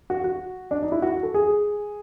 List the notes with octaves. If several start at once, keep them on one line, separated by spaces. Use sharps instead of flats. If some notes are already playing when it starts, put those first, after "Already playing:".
F#4
F#4
D4
D#4
E4
F#4
A4
G#4